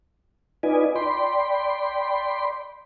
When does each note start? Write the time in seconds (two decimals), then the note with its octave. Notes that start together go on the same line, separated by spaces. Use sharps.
0.63 D#4 F4 B4 D5 D#5 G#5
0.96 D5 G5 B5 C6